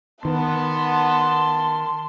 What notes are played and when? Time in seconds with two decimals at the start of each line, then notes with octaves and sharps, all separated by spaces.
0.25 D#3 B3 A5 C6